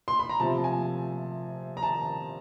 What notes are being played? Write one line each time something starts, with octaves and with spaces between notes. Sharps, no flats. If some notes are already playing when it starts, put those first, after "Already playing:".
C6
B5
A#5
C3 F3 A3 A5
G#5
A#5
A5